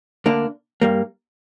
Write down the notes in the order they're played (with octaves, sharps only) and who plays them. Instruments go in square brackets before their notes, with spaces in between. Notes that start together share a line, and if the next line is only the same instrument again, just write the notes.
[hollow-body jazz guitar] D2 D3 A#3 D4
G2 G3 A#3